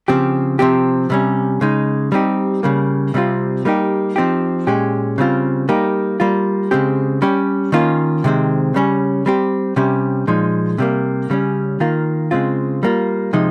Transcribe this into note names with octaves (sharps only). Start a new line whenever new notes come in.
C#3 F3 C4 G4
C3 F3 C4 G4
C3 G3 C#4
C#3 G#3 D#4
G3 C4 D#4 G4
C#3 G3 A#3
C3 G3 C4 F4
G3 A#3 D#4 G4
F3 C4 D#4 G4
A#2 G#3 C#4 G4
C#3 G3 C4 F4
G3 A#3 D#4 G4
G3 A#3 F4
C#3 G#3 C4 G4
G3 C#4 G4
D#3 A#3 C#4 F4
C3 D#3 G#3 C4
C#3 G3 C#4
G3 C4 G4
C3 G3 C#4 G4
A#2 F3 G#3 D#4
C3 G3 A#3
C#3 G3 C#4
D#3 A#3 F4
C#3 G#3 C4 F4
G3 A#3 F4
C3 F3 G#3 D#4